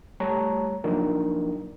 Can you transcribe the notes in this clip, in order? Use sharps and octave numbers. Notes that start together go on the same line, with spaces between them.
G3 A3 C#5 A5 A#5
F3 F#3 A#3 D4 D#4 A#4